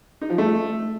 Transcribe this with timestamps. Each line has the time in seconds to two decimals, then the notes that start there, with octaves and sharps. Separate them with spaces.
0.21 D#4
0.30 F3
0.38 A3